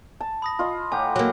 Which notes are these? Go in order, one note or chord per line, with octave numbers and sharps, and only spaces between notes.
A5
B5 D#6 A#6
F4 D#5
A2 G4 F#5 G#5 A#5
F#3 A#3